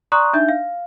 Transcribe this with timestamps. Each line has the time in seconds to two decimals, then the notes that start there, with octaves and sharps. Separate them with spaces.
0.12 D5 A#5 C6 C#6 D#6 F#6
0.33 D4 D#4 E5 G6
0.49 F5